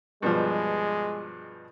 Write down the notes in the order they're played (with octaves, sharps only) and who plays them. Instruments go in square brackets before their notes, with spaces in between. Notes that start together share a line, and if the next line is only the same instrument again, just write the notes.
[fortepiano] G2 B2 F3 [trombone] G#3